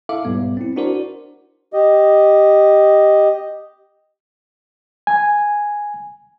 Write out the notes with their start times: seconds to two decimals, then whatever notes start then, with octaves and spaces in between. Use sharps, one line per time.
0.09 E4 A4 E5 F5 D6
0.25 B1 G#2 G3 B3
0.57 C4 E4
0.76 D4 E4 F#4 A#4 C5 D5
1.73 G4 D#5
5.07 G#5